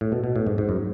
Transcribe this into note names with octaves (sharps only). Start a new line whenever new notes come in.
A2
B2
B2
A2
G#2
G#2
F#2